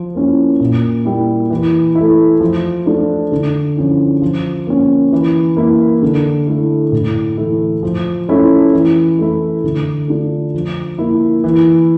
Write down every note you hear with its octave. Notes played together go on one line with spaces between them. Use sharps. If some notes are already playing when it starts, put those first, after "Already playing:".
Already playing: F3
A#3 C#4 E4
A#2
G3 A#3 E4
E3
E4
A3
F3
A3 D4 F4
D3
F3 C#4 E4
F3
A#3 C#4
E3
A#3 E4
D3
A3 E4
A2
E3 A3 E4
F3
A3 C#4 E4
E3
A3 E4
D3
A3 D4 F4
F3
A#3 E4
E3